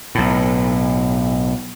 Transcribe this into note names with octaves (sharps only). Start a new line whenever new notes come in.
B1 A2